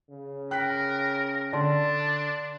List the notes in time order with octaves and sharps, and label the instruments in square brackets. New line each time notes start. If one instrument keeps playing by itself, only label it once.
[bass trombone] C#3
[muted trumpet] A#4 [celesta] G5 [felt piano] F#6 B6
[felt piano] D3 [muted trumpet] D4 [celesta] D5 A5 C6